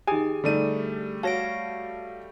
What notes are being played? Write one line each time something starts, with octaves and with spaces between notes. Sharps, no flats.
D#3 G4 G#4 G#5
D3 G3 A3 D4 D#4 D#7
F#4 C#5 F5 A5 A#6 D7